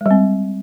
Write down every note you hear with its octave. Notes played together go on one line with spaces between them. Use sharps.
G3 G#3 C4